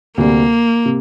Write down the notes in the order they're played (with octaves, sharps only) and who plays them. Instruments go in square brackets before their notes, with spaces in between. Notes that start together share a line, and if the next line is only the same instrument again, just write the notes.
[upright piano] D2 C3 G3 [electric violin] A#3
[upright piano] C3